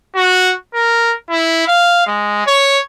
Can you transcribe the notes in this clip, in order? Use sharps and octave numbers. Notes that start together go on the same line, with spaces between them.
F#4
A#4
E4
F5
G#3
C#5